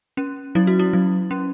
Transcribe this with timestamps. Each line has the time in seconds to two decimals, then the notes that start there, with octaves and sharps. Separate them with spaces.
0.17 C#4
0.55 F#3 E4
0.67 F#4
0.79 E4
0.93 F#3
1.31 C#4